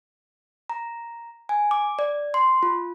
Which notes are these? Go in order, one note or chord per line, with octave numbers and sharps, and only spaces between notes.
A#5
G#5
D6
D5
C6
F4